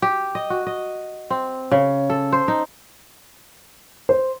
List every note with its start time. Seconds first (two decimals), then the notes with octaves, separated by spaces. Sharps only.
0.02 G4
0.35 D#5
0.50 F#4
0.67 D#5
1.30 C4
1.72 C#3
2.10 A4
2.32 C5
2.48 D#4
4.09 C5